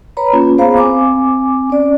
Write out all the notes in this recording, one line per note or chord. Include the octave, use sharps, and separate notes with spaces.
B4 C#5 A#5 B5
A#3 C#4 F4
B3 G#4 C5 F5 A#5 B5
C4 G#5 D6
C#4 D5